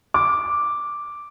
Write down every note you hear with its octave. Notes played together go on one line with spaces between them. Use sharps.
D6